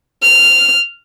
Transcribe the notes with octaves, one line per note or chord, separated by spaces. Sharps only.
F6